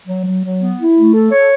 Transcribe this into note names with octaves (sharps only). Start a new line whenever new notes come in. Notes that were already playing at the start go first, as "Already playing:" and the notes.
F#3
F#3
F#3
B3
E4
A3
A4
C#5